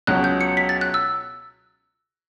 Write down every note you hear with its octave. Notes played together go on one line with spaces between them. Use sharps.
C#2 B2 F#3 C#4 F#6
G6
C#7
B6
A6
F#6
E6